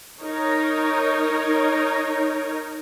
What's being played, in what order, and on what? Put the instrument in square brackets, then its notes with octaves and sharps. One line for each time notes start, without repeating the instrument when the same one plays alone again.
[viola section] D#4 A#4 C#5